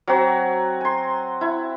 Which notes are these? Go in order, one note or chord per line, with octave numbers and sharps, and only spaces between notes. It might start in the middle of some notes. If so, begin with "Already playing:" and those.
F#3 C4 F#4
G#5 C6
E4